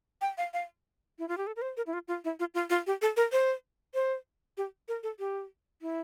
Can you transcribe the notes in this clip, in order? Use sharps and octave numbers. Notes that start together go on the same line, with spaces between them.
G5
F5
F5
E4
F4
G4
A4
A#4
C5
A#4
E4
F4
F4
E4
F4
F4
F4
G4
A4
A#4
C5
C5
G4
A#4
A4
G4
E4